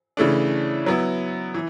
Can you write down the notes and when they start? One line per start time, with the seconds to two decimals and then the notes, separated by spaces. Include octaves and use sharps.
0.17 C#3 E3 A3 D4
0.86 F#3 B3 E4
1.54 E3